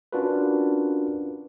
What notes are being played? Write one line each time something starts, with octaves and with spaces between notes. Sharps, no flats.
C#4 D4 F4 F#4 A#4 B4